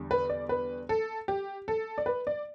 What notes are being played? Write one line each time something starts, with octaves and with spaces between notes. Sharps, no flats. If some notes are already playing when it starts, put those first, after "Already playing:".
Already playing: E2 D3 G3
B4
D5
B4
A4
G4
A4
D5
B4
D5